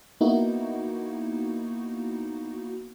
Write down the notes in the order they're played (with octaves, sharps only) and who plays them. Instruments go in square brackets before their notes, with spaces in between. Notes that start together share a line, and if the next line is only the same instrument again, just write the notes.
[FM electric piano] A#3 B3 D#4 E4 F#4